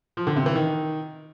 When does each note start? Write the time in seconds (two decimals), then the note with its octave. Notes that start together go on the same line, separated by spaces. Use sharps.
0.17 F3
0.27 D3
0.36 C3
0.46 E3
0.56 D#3